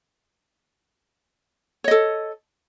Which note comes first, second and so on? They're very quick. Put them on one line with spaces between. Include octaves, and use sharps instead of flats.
C#5 D#5 A4